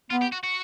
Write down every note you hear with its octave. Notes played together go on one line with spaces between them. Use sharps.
B3 F4
G4
F#4
F#4